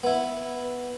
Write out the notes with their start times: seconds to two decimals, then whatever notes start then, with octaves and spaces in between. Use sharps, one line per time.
0.03 B3 E4